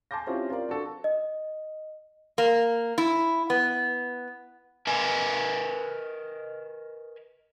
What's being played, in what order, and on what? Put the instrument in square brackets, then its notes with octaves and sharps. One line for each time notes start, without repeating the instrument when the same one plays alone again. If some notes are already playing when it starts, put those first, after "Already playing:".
[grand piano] G#5 A5 C6 D6 G6 A#6
C4 C#4 E4 F4 G4 G#4
F4 A#4 D5
D4 F#4 A4
[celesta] D#5
[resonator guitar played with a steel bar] A#3
E4
B3
[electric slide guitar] A#4 B4 D#5 G#5